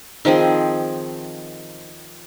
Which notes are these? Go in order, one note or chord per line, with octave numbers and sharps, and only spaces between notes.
D#3 F3 C4 G#4